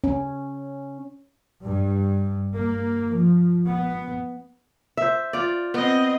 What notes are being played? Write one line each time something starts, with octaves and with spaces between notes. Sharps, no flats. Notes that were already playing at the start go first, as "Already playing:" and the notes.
C#4
G2
A#3
F3
B3
C5 E5
F4 D5
B3 C4 D#5